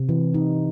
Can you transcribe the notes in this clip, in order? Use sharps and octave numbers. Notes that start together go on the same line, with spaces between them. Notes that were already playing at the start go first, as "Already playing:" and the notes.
Already playing: C3
E3
D#4